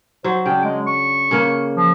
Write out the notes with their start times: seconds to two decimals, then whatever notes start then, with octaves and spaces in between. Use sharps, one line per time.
0.24 F#3 C5
0.46 C#3 D4 G5
0.64 G#3
0.87 C#6
1.31 C#3 A#3
1.76 F3